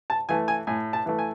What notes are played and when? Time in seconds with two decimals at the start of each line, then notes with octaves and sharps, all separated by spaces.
0.10 A5
0.29 E3 A3 G#5
0.48 G#5
0.67 A2 G#5
0.93 A5
1.06 E3 A3
1.19 G#5